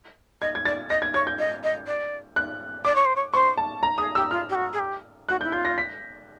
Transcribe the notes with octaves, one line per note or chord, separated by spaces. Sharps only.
D#5 G#6
G#6
D5 A6
D#5 A#6
G#6
C#5 G#6
G6
D#5
D#5
D5
F#6
D5 D6
C#5
C5
C#5
C5 C#6
A5
A#5
G#4 D#6
G4 E6
F4 F6
G4
F#4
G#4
G4
F#4 F#6
G6
E4
F4 G6
A#6
B6